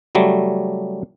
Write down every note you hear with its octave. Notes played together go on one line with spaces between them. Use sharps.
C#3 F#3 G3 A3